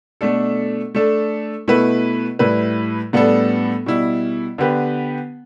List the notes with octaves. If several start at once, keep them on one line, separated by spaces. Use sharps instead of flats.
B2 A3 D4 A4
A3 D4 A4
B2 A3 E4 B4
A2 G3 E4 B4
A2 G3 B3 D4 A4
B2 G3 E4
D3 B3 G4 B4